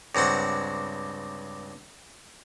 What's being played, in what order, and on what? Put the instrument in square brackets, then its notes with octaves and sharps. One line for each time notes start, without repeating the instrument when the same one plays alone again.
[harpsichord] C#2 G2 C4 F#5 C#6